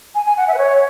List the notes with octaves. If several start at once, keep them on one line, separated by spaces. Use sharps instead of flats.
G#5
G#5
F#5
E5
B4
C#5